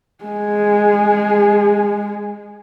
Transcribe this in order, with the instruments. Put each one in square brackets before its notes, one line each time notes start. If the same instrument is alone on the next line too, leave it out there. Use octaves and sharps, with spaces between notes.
[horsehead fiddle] G#3 G#4